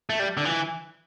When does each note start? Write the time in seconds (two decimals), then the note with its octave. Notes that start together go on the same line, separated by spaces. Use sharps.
0.10 A3
0.19 G3
0.37 D3
0.45 E3